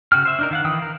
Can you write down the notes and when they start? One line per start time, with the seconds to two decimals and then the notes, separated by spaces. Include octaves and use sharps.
0.12 C#3 F#4 G5 F6
0.25 C5 E5
0.39 D4 D#4 A#4
0.51 D#3 F5 F#5
0.64 D#3 E3 G5 D#6
0.82 A#4